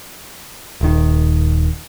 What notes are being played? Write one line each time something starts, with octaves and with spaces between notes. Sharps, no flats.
D#1 D#3